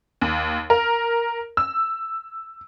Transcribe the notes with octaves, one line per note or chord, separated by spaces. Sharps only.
D#2
A#4
E6